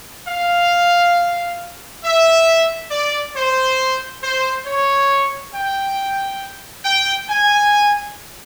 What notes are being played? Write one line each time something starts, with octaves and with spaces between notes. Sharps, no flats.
F5
E5
D5
C5
C5
C#5
G5
G5
G#5